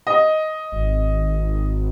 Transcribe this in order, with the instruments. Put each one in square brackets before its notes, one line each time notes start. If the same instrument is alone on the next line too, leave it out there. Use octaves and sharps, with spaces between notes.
[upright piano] D#5
[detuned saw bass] G#1